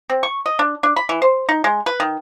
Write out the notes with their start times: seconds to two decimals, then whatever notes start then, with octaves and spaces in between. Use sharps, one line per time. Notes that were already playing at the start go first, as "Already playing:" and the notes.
0.10 C4
0.23 C#6
0.46 D#5
0.59 D4
0.83 D4
0.96 B5
1.09 E3
1.22 C5
1.49 D#4
1.64 G#3
1.86 B4
2.00 D#3